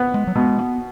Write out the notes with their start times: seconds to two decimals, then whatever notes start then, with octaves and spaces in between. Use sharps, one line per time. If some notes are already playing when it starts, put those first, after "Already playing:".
Already playing: B3
0.14 G#3
0.27 F#3
0.35 B2 G#3
0.58 B3